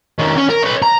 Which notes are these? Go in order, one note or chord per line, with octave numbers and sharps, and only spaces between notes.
D#3 C#4
C#4
A#4
B4 C#5
A#5